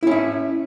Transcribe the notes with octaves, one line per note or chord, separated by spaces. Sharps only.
C#4 E4 E5